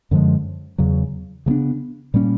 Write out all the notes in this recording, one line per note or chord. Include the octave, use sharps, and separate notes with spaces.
F#2 D3 F3 G#3
E2 C#3 F#3
C#3 F#3 B3 D4
A#2 G3 A#3 C#4